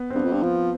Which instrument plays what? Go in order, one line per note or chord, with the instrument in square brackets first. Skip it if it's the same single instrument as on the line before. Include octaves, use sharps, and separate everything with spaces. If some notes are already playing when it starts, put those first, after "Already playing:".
Already playing: [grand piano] B3
C4
[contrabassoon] G2 [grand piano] B3
[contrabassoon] F2
G2
[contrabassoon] F3 [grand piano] B3